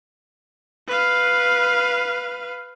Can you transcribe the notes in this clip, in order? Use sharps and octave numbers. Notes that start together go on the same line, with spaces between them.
B4 F5